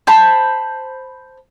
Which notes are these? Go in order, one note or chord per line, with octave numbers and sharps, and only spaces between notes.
C5 A5 B5